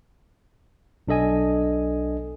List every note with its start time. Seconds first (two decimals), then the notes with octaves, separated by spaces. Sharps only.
1.08 B1 D4 A4 D#5 G#5